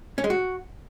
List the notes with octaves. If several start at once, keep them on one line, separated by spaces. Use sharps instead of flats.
C#4
G#3
F#4